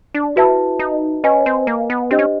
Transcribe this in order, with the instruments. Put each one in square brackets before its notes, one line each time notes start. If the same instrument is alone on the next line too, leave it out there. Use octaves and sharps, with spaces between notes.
[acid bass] D4
[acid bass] E4 [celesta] F#4 B4 E5 A5
[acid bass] D#4
[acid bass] C#4 [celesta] B4 D#5 G#5 B5
[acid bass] C4
A#3
B3
[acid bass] C4 [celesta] D4 G4 C5 D#5
[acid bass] C#4